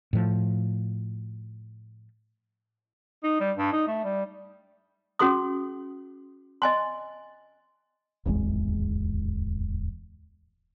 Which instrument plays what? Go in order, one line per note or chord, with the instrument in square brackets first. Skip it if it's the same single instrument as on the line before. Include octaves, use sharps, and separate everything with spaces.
[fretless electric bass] A2 F3
[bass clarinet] D#4
G3
G2
D#4
A3
G3
[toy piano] C#4 F#4 G#4 C6 D#6
D#5 G#5 C6
[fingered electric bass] D1 G#1 E2 G#3